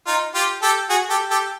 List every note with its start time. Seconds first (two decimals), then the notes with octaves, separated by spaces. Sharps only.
0.07 D#4 F4
0.35 F4 G4
0.63 G4 A4
0.90 F#4 G#4
1.10 G4 A4
1.31 G4 A4